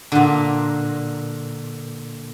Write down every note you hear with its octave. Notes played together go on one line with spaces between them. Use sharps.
A#2 D3